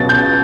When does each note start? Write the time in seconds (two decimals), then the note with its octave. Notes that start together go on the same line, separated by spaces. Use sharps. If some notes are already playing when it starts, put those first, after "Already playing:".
Already playing: C#2 B2 F#3 A6
0.09 G6